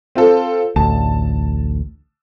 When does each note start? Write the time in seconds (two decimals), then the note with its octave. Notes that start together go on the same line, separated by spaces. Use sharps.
0.15 C4 F4 A4
0.76 A1 D2 A5